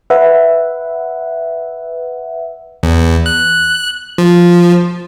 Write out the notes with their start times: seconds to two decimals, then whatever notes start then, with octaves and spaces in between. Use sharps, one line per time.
0.10 B4 E5 F#5
2.83 E2
3.26 F#6
4.18 F3